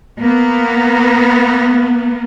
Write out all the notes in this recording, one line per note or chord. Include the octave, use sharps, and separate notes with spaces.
A#3 B3